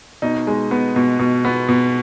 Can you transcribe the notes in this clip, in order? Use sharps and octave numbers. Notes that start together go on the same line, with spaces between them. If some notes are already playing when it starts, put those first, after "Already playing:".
B2 D#4
G#3
B3
B2
B2
B3
B2